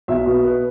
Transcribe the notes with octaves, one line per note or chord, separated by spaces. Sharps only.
B1 E5
B2
B4